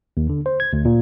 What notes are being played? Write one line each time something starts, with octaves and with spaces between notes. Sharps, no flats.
D#2
D3
C5
G#6
D2
A#2